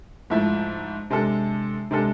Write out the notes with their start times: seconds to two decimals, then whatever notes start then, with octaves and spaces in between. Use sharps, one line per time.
0.30 G#2 F3 A3 E4
1.10 C3 G#3 D4 A4
1.91 C3 G#3 D4 A4